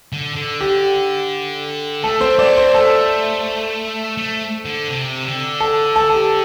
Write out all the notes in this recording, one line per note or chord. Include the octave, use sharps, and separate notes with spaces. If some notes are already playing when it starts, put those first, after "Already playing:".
D3
D3
G4
A3 A4
C4 C5
A3 D5
C4 C5
A3 A4
A3
D3
C3
D3
A4
A4
A4
G4